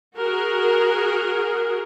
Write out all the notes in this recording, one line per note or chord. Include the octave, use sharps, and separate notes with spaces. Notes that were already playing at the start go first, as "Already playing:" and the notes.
F#4 G#4 A#4